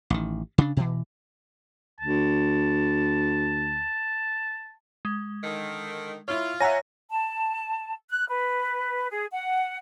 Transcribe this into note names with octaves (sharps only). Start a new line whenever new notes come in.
A1 D#3
C#3 D4
B2 E3
D2 A5
G#3
D3 D#3
E4 F4 C#5
C#5 E5 F#5 G#5 A#5 A#6
A5
F#6
B4
G#4
F#5